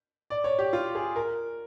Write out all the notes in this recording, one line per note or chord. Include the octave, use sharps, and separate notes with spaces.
D5
C#5
G4
F4
G#4
A#4